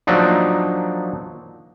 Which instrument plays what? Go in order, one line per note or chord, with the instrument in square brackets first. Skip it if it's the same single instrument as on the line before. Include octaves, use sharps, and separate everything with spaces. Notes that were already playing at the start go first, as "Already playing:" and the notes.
[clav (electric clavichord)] F3 F#3 A#3 D4 D#4